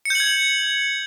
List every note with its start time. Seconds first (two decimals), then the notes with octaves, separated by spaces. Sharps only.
0.05 C#7
0.10 G6
0.15 F#7
0.20 G#6